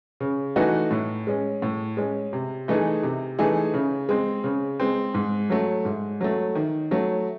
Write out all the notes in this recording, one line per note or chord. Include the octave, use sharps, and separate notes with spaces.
C#3
E3 A3 D#4 F#4
A2
G#3 C#4
A2
G#3 C#4
C3
E3 A3 D#4 G#4
C3
E3 A3 D#4 G#4
C#3
G#3 C4
C#3
G#3 C4
G#2
F#3 A3
G#2
F#3 A3
D#3
F#3 A3